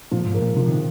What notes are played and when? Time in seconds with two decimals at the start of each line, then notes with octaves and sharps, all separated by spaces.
0.11 A#2 F3
0.26 G#2
0.34 A#4
0.42 A#2
0.56 C3 F3
0.68 D#3